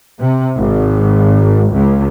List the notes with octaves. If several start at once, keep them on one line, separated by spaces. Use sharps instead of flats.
C3
G#1
C#2